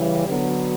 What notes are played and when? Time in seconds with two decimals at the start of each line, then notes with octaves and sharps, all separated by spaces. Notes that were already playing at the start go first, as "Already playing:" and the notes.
Already playing: C#3 E3 G3
0.27 D3 F#3 B3